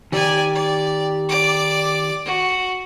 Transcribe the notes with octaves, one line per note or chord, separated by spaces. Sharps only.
D#3 G4 D5 G#5
D5
D5 D6
F#4